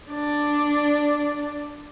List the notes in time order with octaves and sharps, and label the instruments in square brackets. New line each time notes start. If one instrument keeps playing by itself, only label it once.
[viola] D4 D5